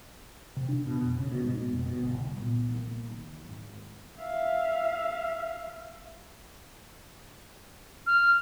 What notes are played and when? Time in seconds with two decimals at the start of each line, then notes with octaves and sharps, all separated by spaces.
0.56 C3
0.69 D4
0.86 B2
1.02 F1
1.19 C#3
1.31 B2
1.44 G#2
1.57 B2
1.69 F1
1.86 B2
1.99 G1
2.14 C2
2.37 A#2 B3
2.69 C2 A#3
3.06 D#3
3.45 G#1
4.20 E5 F5
8.07 F6